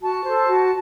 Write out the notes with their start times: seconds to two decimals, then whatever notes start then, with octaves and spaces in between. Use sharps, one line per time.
0.02 F#4 A5
0.24 A4 C5
0.47 F#4